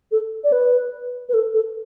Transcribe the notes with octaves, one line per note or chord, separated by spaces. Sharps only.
A4
D5
B4
B4
A4
A4